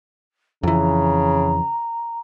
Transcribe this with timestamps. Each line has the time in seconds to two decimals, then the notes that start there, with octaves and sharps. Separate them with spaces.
0.63 F2 C#3 E3 A#5